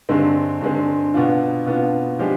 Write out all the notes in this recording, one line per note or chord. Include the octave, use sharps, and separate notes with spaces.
G2 D3 G#3 C4
G2 D3 G#3 C4
B2 B3 D4 F4
B2 B3 D4 F4
F3 G#3 D4 G4